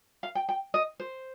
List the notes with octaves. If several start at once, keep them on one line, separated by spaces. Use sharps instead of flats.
F5
G5
G5
D#5
C5